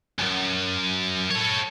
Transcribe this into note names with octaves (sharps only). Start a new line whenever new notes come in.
B1 F#2
A4 C#5